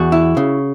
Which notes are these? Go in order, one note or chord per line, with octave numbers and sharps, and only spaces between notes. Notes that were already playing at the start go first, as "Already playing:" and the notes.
Already playing: E2 F#4
E4
C#3